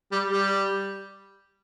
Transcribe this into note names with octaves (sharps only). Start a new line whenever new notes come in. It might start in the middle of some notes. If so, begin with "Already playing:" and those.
G3
G3